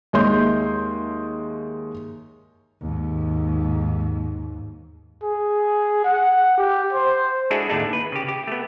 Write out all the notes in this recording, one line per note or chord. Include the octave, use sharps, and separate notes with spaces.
D#2 G#3 C#5 E5 C6 G6
D#2 G#2
G#4
F#5
G4
C5
G#3 D4 E4 F#4 G#4 A4
D#2 A2 A3 D4 D#4
B4
C#3 G4
G4
A3 B3